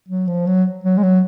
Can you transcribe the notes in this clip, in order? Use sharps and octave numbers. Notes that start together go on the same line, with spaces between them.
F#3
F3
F#3
F#3
G#3
F#3